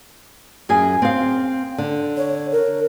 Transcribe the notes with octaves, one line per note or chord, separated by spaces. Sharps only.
F#2 G#4 G#5
C4 F5
D3
C#5
A#4